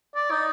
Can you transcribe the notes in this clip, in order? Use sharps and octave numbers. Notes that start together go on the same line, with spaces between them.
D5
D#4